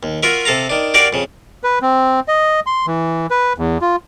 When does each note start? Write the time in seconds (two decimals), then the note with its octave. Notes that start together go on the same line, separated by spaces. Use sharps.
0.03 D#2
0.23 F4 F#4 A#4 E5
0.45 C3 A4 F5 A#5
0.69 D#3 D4
0.94 D4 F#4 G4 A#4 D5 F5
1.13 F2 C#3
1.64 B4
1.82 C4
2.28 D#5
2.66 C6
2.87 E3
3.30 B4
3.58 E2
3.81 F4